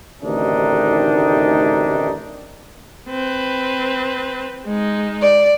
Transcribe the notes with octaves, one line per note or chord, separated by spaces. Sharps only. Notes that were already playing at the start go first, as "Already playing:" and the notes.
A1 D2 C3 D#3 D4 D#4
C4 B4
G#3 D#4
D5